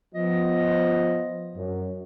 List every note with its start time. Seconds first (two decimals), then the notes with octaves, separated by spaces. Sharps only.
0.15 F3 B3 D#5
1.55 F#2